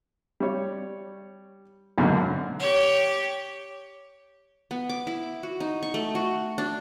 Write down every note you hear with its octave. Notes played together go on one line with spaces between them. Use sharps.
G3 C#5
G#1 F#2 B2 D3 A#3 F6
G4 C#5
B3
D6
E4
F#4
D#4
C#6
A3
F#4
D4